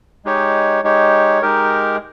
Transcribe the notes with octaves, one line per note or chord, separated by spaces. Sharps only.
G#3 D#4 G4 C#5
G#3 D#4 G4 C#5
G#3 D#4 G4 A#4